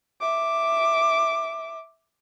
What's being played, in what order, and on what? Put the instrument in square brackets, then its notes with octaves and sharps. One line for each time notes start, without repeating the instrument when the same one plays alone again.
[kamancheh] E5 D6